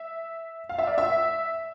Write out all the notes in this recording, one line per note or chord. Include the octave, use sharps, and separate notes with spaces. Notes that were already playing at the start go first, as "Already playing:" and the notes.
Already playing: E5
F5
E5
D5
E5